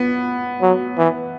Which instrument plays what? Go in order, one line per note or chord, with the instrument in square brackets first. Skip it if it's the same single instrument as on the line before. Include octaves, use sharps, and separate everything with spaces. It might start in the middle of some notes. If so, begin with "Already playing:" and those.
Already playing: [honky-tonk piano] B3
[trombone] F#3
E3